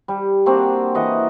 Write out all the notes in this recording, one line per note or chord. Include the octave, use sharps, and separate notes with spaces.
G3
A#3 C4 D4 F#4
E3 D#5 F#5